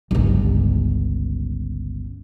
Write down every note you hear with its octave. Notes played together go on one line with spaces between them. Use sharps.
G1 C#2